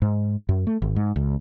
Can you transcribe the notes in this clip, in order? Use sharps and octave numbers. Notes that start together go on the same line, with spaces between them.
G#2
F#2
A3
G#1
G#2
C#2